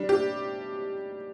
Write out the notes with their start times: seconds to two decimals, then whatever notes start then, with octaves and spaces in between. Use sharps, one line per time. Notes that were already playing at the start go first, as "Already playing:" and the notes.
Already playing: G3 D4
0.09 G4